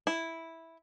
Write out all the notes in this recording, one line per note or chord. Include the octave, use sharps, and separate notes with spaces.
E4